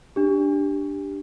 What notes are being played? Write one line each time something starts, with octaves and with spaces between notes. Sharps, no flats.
D4 G4